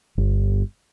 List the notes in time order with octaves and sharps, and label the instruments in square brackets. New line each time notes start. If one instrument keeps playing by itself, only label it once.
[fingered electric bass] G1